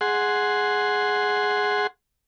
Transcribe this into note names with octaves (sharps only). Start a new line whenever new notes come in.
G#4 F#5 C6